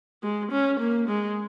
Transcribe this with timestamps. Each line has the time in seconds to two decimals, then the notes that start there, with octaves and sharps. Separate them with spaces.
0.23 G#3
0.51 C#4
0.80 A#3
1.08 G#3